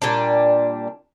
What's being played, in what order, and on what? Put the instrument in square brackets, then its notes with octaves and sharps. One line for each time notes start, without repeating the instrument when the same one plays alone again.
[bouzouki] A#2 G3 D4